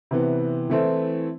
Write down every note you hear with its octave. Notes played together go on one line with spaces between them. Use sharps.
C3 E3 B3
E3 A3 C4 E4